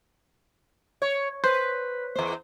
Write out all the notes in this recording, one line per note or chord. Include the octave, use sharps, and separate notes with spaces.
C#5
B4 C5
E2 C5